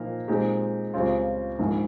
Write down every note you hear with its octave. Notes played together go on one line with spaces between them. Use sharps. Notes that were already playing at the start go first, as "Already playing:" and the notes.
Already playing: A#2 F3 A#3 D#4
A#2 G#3 C4 D#4 G4
C#2 C#3 G3 C4 F4
A#1 G#2 D#3